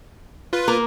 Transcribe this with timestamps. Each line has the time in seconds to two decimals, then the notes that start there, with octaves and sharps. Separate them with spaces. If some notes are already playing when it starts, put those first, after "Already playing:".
0.53 F4 B4
0.68 A#3 A#4